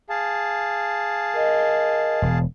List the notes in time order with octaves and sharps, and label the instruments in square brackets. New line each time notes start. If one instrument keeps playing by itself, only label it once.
[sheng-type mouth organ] G#4 F5 A5
[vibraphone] A#4 D#5
[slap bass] E1